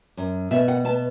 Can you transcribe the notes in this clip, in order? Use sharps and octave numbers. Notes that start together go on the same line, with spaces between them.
F#2
B2 E5
F#5
B3 A5